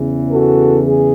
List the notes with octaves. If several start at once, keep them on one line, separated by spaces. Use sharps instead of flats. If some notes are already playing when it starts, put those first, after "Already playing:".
Already playing: E2 C#3 E3
F#4 A4
G#4